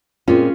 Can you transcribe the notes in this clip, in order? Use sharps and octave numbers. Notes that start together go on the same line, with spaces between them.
A#2 G#3 C4 C#4 F4